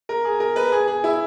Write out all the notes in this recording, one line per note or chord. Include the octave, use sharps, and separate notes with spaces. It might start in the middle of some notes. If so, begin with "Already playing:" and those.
A#4
G#4
A#4
B4
G#4
G#4
E4